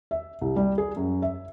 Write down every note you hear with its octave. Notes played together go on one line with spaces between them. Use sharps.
E5
C2
G3
G#4
F#2
E5